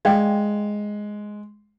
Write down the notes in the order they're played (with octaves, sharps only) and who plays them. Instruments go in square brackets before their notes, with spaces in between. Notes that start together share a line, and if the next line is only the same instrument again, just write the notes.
[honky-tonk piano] G#3 [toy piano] D5 F5 G5